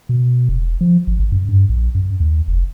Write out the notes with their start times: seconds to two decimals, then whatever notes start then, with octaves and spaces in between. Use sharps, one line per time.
0.09 B2
0.49 E1
0.81 F3
1.07 G#1
1.19 G#1
1.32 F#2
1.48 G2
1.69 A#1
1.95 F#2
2.20 D#2
2.48 F1